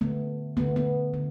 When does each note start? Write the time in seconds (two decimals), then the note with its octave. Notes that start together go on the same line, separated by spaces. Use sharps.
0.01 D3 A3 B3
0.57 D3 A3 B3
0.76 B3
1.14 D3